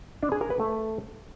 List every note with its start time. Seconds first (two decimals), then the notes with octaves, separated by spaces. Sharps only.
0.23 D4
0.32 G#4
0.41 A#4
0.50 B4
0.60 A3